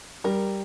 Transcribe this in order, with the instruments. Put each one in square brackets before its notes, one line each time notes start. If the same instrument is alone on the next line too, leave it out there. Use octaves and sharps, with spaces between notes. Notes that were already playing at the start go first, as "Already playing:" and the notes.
[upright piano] G3 [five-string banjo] A#4